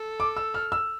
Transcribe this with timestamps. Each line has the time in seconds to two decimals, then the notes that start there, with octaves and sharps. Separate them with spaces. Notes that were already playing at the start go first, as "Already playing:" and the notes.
Already playing: A4
0.20 D6
0.37 E6
0.54 F6
0.72 E6